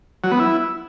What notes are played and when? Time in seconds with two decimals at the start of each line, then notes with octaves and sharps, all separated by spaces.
0.24 F#3
0.32 B3
0.40 E4